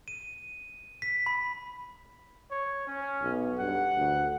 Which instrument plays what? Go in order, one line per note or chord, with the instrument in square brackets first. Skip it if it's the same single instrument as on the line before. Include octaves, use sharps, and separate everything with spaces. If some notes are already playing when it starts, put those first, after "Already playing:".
[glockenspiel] D#7
B6
B5
[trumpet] C#5
C#4
[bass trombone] B1
[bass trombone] G2 [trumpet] F#5
[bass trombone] D2